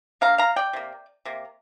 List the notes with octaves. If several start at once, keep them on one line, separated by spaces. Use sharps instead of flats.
D3 A#3 F5 A#5
F5 A#5
D5 G5
C3 A#3
C3 A#3